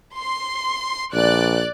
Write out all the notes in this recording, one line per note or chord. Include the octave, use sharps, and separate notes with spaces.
C6
A#1 D5 F#6